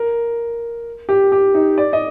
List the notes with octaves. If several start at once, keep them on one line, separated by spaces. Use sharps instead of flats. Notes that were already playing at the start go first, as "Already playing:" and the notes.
Already playing: A#4
G4
G4
D#4
D5
D#5